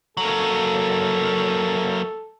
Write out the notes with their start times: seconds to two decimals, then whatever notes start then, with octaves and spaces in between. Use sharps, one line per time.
0.17 F#3 A#3 A4